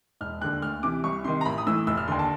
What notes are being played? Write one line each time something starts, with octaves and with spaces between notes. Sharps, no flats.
E1 F6
D#2 D3 F#6
D2 F6
C3 E3 D6
C2 C#6
C3 D#3 C6
A#5
A1 B5
D#6
A2 E3 E6
F1 E6
F6
D#2 D3 C6
A5